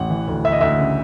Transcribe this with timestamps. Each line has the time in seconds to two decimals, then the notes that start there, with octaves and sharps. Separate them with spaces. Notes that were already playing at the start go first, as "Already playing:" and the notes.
Already playing: A1 F#5
0.10 E3
0.28 D2
0.44 D2 E5
0.52 D#5
0.61 D2 E5
0.78 C#3